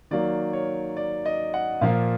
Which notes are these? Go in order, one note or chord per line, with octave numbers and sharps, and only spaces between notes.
D#3 F#3 A#3 D5
C#5
D5
D#5
F#5
A#2 F3 A#3 F5